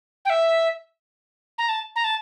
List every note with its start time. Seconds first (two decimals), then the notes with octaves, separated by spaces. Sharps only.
0.25 G5
0.30 E5
1.58 A#5
1.69 A5
1.96 A#5
2.04 A5